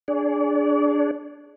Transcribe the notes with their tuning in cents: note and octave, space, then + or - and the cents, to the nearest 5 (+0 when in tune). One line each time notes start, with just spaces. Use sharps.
D4 -5 G#4 +0 D5 -40